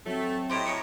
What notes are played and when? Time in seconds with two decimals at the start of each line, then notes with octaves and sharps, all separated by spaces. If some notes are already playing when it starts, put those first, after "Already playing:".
0.06 F#3 A3 C4
0.50 A2 D#4 G4 C5
0.66 C#5 D#5 A#5